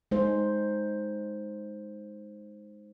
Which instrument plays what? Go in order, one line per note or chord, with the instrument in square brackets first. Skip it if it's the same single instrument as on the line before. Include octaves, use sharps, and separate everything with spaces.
[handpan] G#3 D#4 C5